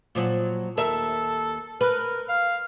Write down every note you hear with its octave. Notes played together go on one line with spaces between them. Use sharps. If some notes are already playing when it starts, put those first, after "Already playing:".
A#2 F3 F#3
D#2 A4 A#4 E5
A#4 B4
F5